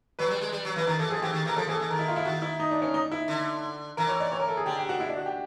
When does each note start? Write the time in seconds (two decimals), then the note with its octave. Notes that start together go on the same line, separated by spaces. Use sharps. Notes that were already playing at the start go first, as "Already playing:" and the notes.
0.19 F#3 B4
0.30 G3
0.41 G#3
0.52 G3
0.65 F#3
0.76 E3 B4
0.87 D#3 A#4
0.99 E3 A4
1.10 F3 G#4
1.22 E3 G4
1.33 D#3
1.45 E3 A#4
1.56 F3 A4
1.67 E3 G#4
1.74 A4
1.80 E3
1.90 D#3 A#4
1.99 E4
2.08 F4
2.16 E4
2.25 D#3 F#4
2.42 E4
2.60 D#4
2.71 D4
2.82 C#4
2.94 D#4
3.12 E4
3.28 D3
3.97 E3 A#4
4.09 C#5
4.20 D5
4.32 C#5
4.40 A#4
4.48 A4
4.57 G#4
4.66 D3 G4
4.77 G4
4.89 F#4
5.00 E4
5.09 D4
5.17 F#4
5.26 G4